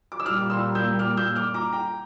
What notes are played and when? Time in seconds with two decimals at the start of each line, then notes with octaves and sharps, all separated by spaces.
0.12 D6
0.20 E6
0.26 A#2 G3 A#3 D6 F6
0.50 C6 E6
0.75 E6 G6
0.99 D6 F6
1.17 E6 G6
1.36 D6 F6
1.54 A#5 D6
1.73 G5 A#5